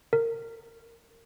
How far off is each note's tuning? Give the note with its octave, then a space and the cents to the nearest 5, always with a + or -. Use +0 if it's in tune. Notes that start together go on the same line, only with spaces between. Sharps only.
A#4 -25